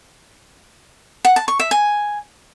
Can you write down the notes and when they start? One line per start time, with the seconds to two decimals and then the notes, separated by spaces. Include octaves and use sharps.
1.25 F#5
1.36 A5
1.48 C#6
1.59 E5
1.71 G#5